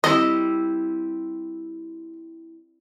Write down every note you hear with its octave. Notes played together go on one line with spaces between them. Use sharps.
G3 C4 E4 D#5